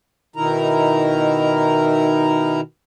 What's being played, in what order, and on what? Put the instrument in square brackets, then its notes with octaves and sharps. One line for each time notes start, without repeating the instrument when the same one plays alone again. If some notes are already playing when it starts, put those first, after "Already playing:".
[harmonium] B2 D#3 D#4 E4 A#4 A#5